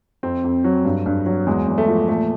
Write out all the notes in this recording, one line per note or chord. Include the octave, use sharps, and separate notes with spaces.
F2 C4
F2
F#3
G2
G2
F#3
E2 G#3
E2
A3
F3
A#2 A3